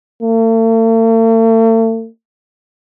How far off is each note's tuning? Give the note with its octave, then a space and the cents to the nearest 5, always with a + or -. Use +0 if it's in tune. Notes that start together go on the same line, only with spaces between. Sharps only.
A3 +45